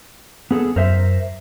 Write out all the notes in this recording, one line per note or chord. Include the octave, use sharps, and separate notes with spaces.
B3 G#4 A4
F#2 A#4 C5 E5